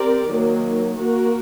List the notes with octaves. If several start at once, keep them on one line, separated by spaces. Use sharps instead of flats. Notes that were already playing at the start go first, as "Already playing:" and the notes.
Already playing: C4 G4 A#4 D5
D#3 F#3 A#3
A#3 F#4 A#4